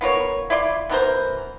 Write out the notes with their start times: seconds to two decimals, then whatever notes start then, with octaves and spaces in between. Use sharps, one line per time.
0.01 B3 F4 A#4 C#5
0.50 E4 F4 D5 C6
0.90 B2 E3 A#4 C5